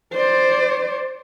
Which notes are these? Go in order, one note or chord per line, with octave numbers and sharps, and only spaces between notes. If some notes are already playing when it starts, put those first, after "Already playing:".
C5 D5